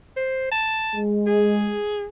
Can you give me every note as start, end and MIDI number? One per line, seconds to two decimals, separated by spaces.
0.17 0.49 72
0.51 0.99 81
0.96 1.78 56
1.26 2.06 68